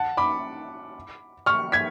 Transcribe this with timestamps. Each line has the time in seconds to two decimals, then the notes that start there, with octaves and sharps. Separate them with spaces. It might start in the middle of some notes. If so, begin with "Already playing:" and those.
Already playing: F#5 A5
0.17 B5 D6
1.46 C#6 F6
1.72 G#6 B6